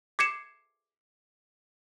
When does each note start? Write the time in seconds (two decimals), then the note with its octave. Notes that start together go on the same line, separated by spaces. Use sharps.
0.19 D6 G#6 C7 C#7 E7